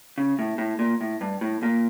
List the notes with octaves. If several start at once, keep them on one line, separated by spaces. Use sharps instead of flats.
C#3
A2
A2
A#2
A2
G2
A2
A#2